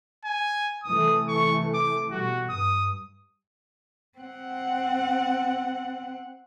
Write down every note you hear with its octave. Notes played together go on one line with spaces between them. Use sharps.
G#5
C3 E3 A3 D#6
C#6
D6
B2 G3 F#4
G2 D#6
C4 F#5